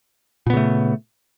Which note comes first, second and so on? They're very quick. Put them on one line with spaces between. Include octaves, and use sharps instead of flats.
A#2 B3 C#3 A3